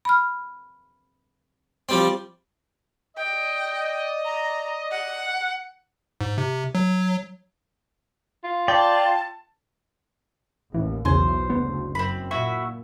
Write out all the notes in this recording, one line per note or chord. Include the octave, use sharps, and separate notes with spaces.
B5 F6
F3 G3 C4
D5 D#5 G5
A#5
F#5
G#2
C3
F#3
F4
D5 G5 A5
A1 D#2 E3
B1 E2 C#3 E3 C5 G#5
F#1 D2 B3
F#2 C4 B5
A#2 E4 F#4 E5